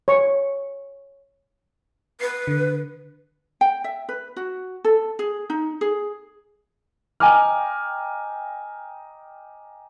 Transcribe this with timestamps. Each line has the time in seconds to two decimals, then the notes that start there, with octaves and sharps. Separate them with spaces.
0.08 C#5 C#6
2.21 B4 C7
2.47 D3
3.61 G5
3.84 E5
4.09 B4
4.36 F#4
4.84 A4
5.19 G#4
5.50 D#4
5.81 G#4
7.20 D#5 G5 G#5 A#5 D6 F6